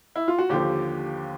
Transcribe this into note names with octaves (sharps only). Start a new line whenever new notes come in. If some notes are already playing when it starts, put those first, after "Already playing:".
E4
F4
F#4
D#2 D3 F3 G4